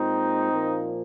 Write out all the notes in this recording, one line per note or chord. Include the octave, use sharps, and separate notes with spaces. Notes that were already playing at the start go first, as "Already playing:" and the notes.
Already playing: A#2 G#3 C4 D#4
A#2 F3 A#3